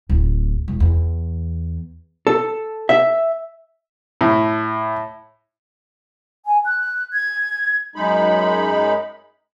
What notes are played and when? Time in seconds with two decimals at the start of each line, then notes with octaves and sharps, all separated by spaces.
0.09 D1
0.68 E1
0.80 E2
2.27 A4
2.89 E5
4.21 A2
6.46 G#5
6.64 F#6
7.13 G#6
7.96 F#2 G#3 D#4 B5